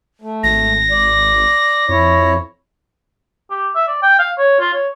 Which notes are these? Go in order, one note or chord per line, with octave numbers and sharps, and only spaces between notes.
A3
G#1 A#6
D5
F2 E4 C#5
G4
E5
D5
G5
F5
C#5
F4
C#5